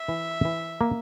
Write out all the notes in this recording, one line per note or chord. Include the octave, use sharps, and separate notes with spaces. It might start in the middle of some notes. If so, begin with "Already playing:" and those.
Already playing: E5
E3
E3
A#3